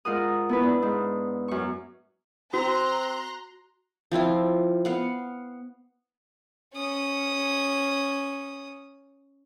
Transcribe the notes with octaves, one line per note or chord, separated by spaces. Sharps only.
G#2 F4 A#4 F#5 D#6
B3 E4 B4
D4
G#2
F#2 C#6
C4 F#4 A#5 C6 F#6
F3 C4 E4 F4
B3 F5 F#5
C#4 D#6